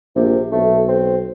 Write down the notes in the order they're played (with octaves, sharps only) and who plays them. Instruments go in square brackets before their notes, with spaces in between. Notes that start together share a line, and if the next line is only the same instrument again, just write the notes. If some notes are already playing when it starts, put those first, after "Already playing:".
[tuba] A#1 [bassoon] C3
[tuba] B1 [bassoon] A3
[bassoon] C4